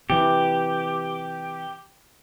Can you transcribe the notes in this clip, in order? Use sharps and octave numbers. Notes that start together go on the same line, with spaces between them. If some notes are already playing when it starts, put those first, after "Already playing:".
C3 E3 G4